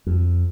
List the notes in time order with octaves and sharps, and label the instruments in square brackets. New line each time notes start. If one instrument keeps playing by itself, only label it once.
[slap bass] F2